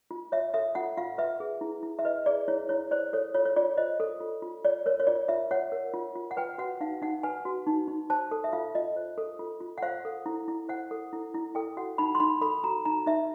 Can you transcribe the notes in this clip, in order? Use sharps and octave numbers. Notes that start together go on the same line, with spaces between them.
F4
C#5 E5
A4 E5
F4 F#5
F4 F5
B4 E5
G#4
E4
E4
E5
B4 D#5
G#4 D5
E4 C#5
E4 C#5
C5 D5
A4 C#5
F4 C#5
C#5
F4 D5
C5 D#5
A4
F4
F4
C#5 D5
A#4 C#5
C#5
F4 D5
F4 E5
C#5 F#5
A#4
F4
F4
F#5
B4 G5
F#4 F#5
D#4 F5
D#4 F#5
B4 G#5
F#4
D#4
D#4
C5 A5
A4
E5
F4 F5
F4 D#5
C5
A4
F4
F4
F#5
C5 F5
A4
E4
E4
C5 F#5
A4
E4
E4
A4 G5
F#4 F#5
D#4 B5
C6
D#4 B5
A4 B5
F#4 A#5
D#4 A#5
D#4 E5